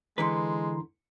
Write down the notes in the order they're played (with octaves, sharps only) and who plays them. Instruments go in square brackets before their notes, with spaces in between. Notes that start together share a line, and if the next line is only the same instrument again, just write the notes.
[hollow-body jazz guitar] D3 E3 B4 [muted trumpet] G#3 [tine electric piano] A#5 C6